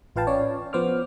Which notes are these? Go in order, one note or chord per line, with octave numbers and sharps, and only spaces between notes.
A1 F4 B4 F5 G5 A5
C#4 C#5 D5
F3 B3 C5 D6 F6